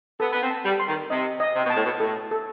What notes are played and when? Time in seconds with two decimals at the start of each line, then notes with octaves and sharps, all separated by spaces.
0.20 B3 A4
0.32 B3
0.43 C4
0.51 A5
0.65 G3
0.80 C6
0.87 D#3
1.10 C3 D#5
1.40 D#5
1.55 C3
1.65 B2
1.70 A5
1.76 A2
1.85 B2
2.00 A2 A4
2.31 A4